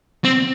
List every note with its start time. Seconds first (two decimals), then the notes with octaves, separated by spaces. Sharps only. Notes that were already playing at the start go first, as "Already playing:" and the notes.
0.25 C4